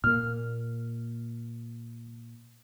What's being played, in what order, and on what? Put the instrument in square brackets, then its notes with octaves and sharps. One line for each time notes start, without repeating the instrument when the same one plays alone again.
[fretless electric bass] A#2 A#3 [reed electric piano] F6